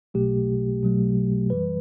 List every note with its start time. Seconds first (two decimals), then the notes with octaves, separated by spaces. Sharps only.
0.14 B1 B2 F#3 A3 G4
0.83 B1 B2 F#3 A3
1.50 F#2 E3 G3 B4